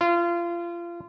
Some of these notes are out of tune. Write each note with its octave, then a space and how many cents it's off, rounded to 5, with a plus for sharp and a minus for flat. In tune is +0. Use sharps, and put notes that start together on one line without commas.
F4 -25